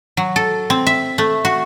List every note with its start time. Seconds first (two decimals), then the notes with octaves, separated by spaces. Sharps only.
0.17 F#3
0.36 A4
0.70 C4
0.87 E5
1.18 A3
1.45 F#4